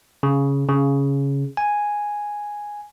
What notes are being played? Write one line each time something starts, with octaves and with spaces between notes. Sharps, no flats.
C#3
C#3
G#5